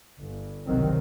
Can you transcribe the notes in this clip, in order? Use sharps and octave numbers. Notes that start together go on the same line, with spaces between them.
G1
G1 C2 B2 D#3 F#3 C4